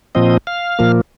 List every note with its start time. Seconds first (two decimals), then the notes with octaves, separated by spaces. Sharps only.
0.15 A#2 F3 C4 D#5
0.47 F5
0.79 A#2 F3 A#3